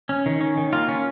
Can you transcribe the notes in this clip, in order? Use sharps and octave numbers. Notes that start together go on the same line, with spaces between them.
C#4
D#3
C#4
D#3
A#3 F4
C#4